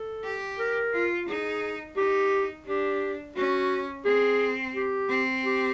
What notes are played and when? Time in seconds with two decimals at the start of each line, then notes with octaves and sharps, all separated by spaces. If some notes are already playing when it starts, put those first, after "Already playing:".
Already playing: A4
0.24 G4
0.58 A#4
0.93 F4
1.28 D#4 G#4
1.97 D#4 G4
2.66 D4 G4
3.36 C#4 F#4
4.05 C4 G#4
4.74 G4
5.09 C4
5.44 G4